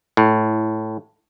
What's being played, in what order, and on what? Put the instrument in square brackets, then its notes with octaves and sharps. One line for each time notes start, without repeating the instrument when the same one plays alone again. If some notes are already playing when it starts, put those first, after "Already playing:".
[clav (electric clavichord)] A2